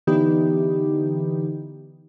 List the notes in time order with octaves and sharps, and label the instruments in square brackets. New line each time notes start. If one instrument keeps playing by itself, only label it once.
[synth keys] D3 E3 B3 D#4 G4